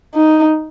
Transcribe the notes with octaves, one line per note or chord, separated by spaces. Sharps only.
D#4